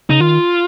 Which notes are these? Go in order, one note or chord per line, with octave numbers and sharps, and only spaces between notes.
C#3 D#4
D#3 F4